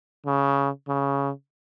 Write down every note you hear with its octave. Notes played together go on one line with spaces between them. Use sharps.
C#3
C#3